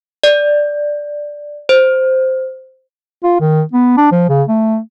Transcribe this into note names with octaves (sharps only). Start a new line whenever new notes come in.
D5
C5
F4
D#3
B3
D4
F3
C#3
A3